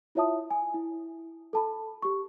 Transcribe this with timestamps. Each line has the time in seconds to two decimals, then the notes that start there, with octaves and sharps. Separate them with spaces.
0.15 E4 F4 C#5 E5 A5 D#6
0.50 G#5
0.74 E4
1.53 A4 A5 B5
2.02 G4 C#6